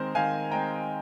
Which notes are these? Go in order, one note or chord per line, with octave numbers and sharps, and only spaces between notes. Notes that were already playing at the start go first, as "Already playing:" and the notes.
Already playing: D#3 G#3 C4 A#4 C5
D#3 F5 G#5
G#3 C4 G5 A#5